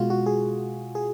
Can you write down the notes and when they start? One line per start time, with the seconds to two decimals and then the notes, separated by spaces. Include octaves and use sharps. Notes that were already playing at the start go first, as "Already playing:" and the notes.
Already playing: B2 G#3 F4 F#4
0.10 F#4
0.26 G#4
0.95 G#4